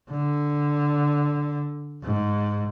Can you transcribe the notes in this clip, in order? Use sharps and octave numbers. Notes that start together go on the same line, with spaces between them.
D3
G#2